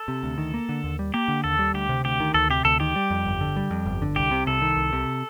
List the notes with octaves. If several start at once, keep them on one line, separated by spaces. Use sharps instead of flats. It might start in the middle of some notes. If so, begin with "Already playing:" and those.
Already playing: A4
C3
D2
D#3
A#3
D3
D#2
G3
A#3 G4
D3
D#2 A4
G3
D2 G4
C3
D2 G4
D#3
D2 A4
C3 G4
D2 A4
D#3 G4
G3
F2
G1
D3
G3
F2
G1
D3
C2 G4
C3
C2 A4
D#3
C2
C3